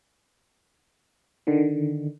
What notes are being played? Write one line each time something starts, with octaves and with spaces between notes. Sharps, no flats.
D3 D#3